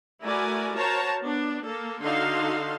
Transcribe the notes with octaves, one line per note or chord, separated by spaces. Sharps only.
A3 E4 F#4 A#4 D5 G#5
F#4 A#4 C5 C#5 A5 A#5
B3 D4
A#3 A4
D3 D#4 F#4 A4 F5 C6